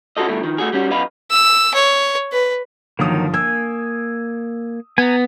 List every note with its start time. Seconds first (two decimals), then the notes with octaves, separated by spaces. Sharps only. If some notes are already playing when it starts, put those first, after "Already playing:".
0.17 C#4 F#4 G#4 A4 D#5
0.28 G2 B2 A3
0.43 D#3 F3
0.58 A3 F#4 G#4
0.73 G3 C#4 F#4
0.90 F#2 B3 D#5 F5 B5
1.31 E6
1.74 C#5
2.32 B4
2.99 G1 D#3 F3 F#3 A#3 D#6
3.34 A#3 G#5 E6
4.98 B3 G#5 A#5